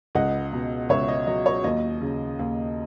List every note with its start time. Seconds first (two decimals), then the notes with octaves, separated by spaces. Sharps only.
0.15 C#2 D#5 F#5
0.53 B2
0.89 C#2 C#5 E5
1.08 D#5
1.27 F#3 D#5
1.46 C#5
1.64 D#2 D#5
2.01 C#3
2.39 D#2